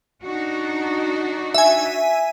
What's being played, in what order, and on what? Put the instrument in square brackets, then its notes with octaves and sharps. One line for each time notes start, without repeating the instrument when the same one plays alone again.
[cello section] D4 D#4 F#4
[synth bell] E5 G#5